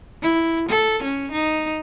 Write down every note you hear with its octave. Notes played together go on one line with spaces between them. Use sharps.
E4
A4
C#4
D#4